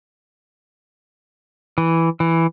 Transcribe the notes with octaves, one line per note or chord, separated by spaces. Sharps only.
E3
E3